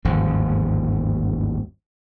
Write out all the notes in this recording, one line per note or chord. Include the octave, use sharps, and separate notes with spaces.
G1 D#2 G#2 F3